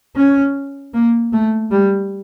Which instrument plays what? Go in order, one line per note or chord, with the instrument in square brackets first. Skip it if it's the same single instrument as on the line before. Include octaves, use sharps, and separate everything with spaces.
[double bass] C#4
A#3
A3
G3